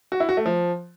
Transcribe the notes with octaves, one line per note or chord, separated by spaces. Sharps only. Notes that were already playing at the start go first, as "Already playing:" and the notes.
F#4
E4
F#4
A3
F3